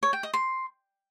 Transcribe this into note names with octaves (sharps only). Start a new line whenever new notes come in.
C#5
G5
D#5
C6